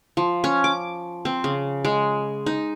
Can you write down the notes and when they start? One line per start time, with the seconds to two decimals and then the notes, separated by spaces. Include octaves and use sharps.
0.17 F3
0.44 C#4
0.64 D6
1.25 C4
1.44 C#3
1.85 G#3
2.46 D#4